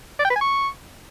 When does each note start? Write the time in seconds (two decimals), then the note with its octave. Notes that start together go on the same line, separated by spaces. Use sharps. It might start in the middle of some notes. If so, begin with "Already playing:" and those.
0.19 D5
0.25 G5
0.30 B4
0.36 G#5
0.41 C#6